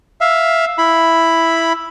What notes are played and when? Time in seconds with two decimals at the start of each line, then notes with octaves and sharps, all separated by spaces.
0.21 E5 F5
0.78 E4 B5